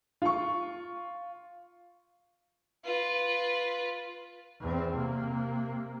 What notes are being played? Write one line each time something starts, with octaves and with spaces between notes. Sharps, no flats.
F4 C#6
F4 B4
E2 C4
C3 A#3